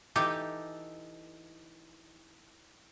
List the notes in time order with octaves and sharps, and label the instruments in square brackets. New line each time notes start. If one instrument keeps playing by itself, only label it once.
[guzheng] E3 D#4 G4 A4